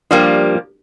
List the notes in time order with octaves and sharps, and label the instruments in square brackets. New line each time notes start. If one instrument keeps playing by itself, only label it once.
[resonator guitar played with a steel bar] F3 G3 A#3 [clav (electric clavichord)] D4 G4